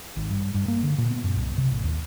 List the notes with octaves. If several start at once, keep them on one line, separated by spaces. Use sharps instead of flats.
G#1
G2
G2
A#3
D3
A#2
B3
F#2
C2
C3
A1
D#2